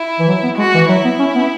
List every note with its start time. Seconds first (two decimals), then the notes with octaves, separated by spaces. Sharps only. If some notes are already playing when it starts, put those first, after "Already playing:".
Already playing: E4
0.19 E3
0.28 F#3
0.43 B3
0.58 G#3 F#4
0.74 E3
0.89 F#3 E4
1.05 B3
1.19 C#4
1.35 B3